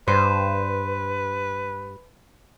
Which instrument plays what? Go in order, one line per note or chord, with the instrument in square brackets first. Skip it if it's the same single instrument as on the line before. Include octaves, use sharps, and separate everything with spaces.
[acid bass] G2 [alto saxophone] B4 [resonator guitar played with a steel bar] C5